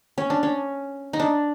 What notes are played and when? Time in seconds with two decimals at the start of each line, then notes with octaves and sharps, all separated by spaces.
0.18 C#4
0.30 D4
0.43 C#4
1.13 D#4
1.20 D4